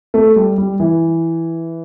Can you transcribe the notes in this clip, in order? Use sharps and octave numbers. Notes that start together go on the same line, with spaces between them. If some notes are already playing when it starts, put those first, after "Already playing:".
A3
G3
G3
E3